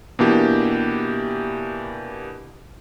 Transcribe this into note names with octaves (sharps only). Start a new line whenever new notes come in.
B2 E3 A#3 D4 E4 G4